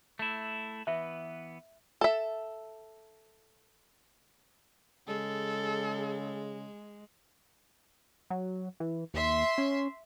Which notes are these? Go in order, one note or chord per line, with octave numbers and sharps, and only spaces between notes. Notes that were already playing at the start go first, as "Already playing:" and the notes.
A3 E4
E3 B3 E5
A4 E5
C#3 G#3 A4
F#3
E3
D#2 E5 C6
C#4